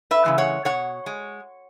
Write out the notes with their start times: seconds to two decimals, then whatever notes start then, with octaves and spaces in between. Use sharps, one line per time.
0.11 B4 E5
0.25 C#3 E3 G#3
0.38 C#5 F#5
0.65 B2 C#5 F#5
1.06 G#3